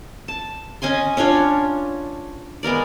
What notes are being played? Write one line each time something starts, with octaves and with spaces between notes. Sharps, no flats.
A5
C#4 D#5 G#5 C6
C#4 D4 F4 C#5
G#3 B3 A#4 D5